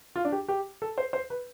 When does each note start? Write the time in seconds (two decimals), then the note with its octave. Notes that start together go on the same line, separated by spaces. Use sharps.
0.16 F4
0.25 D4
0.32 G4
0.48 G4
0.82 A4
0.98 C5
1.13 C5
1.30 B4